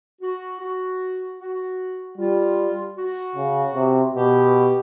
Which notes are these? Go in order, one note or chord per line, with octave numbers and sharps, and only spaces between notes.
F#4
F#4
F#4
G3 F4
F#4
C#3
C3
B2 G4